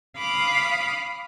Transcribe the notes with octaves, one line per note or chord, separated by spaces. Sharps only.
F5 B5 D6 D#6